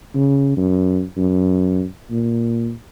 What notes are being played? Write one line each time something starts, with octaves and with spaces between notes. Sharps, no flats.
C#3
F#2
F#2
A#2